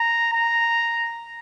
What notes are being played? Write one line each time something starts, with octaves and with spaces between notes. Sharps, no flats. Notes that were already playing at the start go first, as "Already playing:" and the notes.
Already playing: A#5
A#5